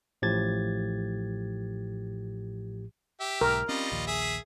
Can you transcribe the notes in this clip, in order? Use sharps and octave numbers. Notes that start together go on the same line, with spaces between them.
A1 A2 F3 G4 G#6 A6
G4 E5
B1 G#2 A#4
G3 C4 C#4 F4 D#5
A#1 D#2
G#4 E5